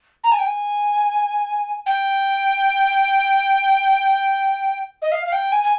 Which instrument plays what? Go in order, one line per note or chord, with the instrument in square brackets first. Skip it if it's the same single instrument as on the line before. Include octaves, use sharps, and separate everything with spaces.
[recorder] A#5
G#5
G5
G#5
G5
D#5
F5
F5
G5
G#5
G#5